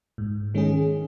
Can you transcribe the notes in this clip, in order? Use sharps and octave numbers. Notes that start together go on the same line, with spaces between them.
G#2
D#3 G#3 C#4 G#4